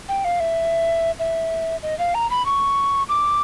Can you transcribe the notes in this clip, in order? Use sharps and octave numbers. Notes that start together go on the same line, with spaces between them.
G5
F5
E5
E5
D#5
F5
A#5
B5
C#6
D6